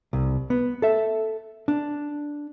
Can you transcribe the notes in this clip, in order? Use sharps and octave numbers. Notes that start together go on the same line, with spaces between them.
C2
B3
A4 E5
D4